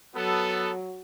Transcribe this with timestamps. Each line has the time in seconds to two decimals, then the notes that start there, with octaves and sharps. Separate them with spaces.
0.16 F#3 B3 A4